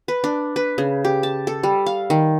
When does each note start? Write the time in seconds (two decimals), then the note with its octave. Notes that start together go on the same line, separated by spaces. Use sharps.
0.08 B4
0.24 D4
0.56 B4
0.78 C#3
1.05 G4
1.23 A5
1.47 A4
1.63 G3
1.86 F5
2.10 D#3